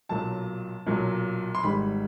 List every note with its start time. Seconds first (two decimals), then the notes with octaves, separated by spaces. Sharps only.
0.09 B1 A#2 F#3 A5
0.87 B1 A#2 F#3
1.55 C6
1.63 G#1 G#2 D#3 G3 B5